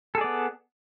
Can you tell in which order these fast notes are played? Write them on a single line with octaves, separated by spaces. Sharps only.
A4 G#4 D5 B3